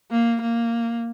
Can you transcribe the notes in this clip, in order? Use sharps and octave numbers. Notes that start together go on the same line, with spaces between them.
A#3
A#3